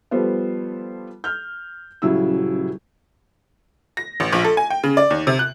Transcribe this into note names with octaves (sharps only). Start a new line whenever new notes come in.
F3 G3 B3 A4 C5
F6 G6
D#1 C#3 F#3 E4 E6
A#6
A1
A#1
A4
G#5
G5
C#3
D5
D#2
C3
F#6